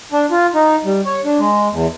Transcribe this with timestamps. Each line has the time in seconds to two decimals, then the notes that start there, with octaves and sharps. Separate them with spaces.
0.12 D4
0.31 F4
0.55 D#4
0.85 G3
1.06 C#5
1.25 D4
1.39 G#3
1.72 E2